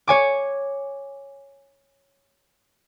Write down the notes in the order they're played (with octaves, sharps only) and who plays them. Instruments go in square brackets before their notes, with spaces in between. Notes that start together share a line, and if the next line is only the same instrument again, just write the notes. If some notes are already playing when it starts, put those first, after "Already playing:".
[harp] C#5 G#5 D6